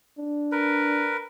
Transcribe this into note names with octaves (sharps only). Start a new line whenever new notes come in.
D4
A#4 B4